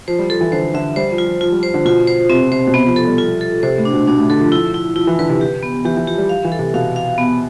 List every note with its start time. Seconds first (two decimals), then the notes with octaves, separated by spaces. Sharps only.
0.08 F3 C5
0.19 G3
0.30 F3 A4
0.41 E3
0.52 D3 C5
0.74 D3 E5
0.96 G3 C5
1.11 F3
1.18 F4
1.26 F3
1.41 F3 F4
1.52 G3
1.63 C5
1.74 D3
1.85 B2 F4
2.07 C5
2.30 C3 C4
2.52 C3 C5
2.67 B2
2.74 C3 B3
2.85 F3
2.96 F3 A4
3.07 G3
3.18 F3 F4
3.41 A4
3.63 C3 C5
3.78 A2
3.85 D4
3.93 B2
4.07 B2 D4
4.18 A2
4.30 D3 A4
4.41 F3
4.52 F3 E4
4.74 E4
4.96 F3 E4
5.07 E3
5.19 D3 B4
5.30 C3
5.41 G4
5.63 B3
5.85 E3 G4
5.97 E3
6.07 F3 G4
6.18 G3
6.29 F5
6.45 E3
6.52 A4
6.59 C3
6.74 B2 F5
6.96 F5
7.18 B3